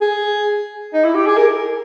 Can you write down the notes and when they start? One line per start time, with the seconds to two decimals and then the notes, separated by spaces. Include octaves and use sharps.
0.01 G#4
0.94 D#4
1.04 E4
1.15 G4
1.27 G#4
1.37 A#4